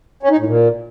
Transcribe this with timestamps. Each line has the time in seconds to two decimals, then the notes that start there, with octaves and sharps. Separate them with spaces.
0.23 C#4
0.31 D#4
0.38 A2
0.46 A#2